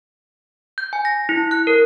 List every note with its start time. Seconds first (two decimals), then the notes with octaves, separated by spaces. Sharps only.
0.78 G6
0.93 G#5
1.05 A#6
1.29 E4
1.51 F#6
1.67 A#4